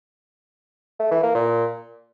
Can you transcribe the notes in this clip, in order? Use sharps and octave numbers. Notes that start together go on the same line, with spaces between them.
A3
E3
A#3
A#2